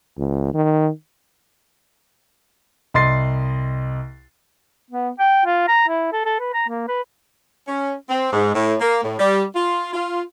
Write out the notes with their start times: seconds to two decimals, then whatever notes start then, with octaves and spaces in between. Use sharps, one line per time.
0.18 C#2
0.54 D#3
2.94 C2 D#5 C6 A6 C7
4.91 B3
5.19 G5
5.46 F4
5.68 A#5
5.88 E4
6.13 A4
6.25 A4
6.40 B4
6.54 A#5
6.69 A#3
6.88 B4
7.68 C#4
8.09 C4
8.33 G#2
8.54 A2
8.81 A#3
9.04 A2
9.19 G3
9.55 F4
9.93 F4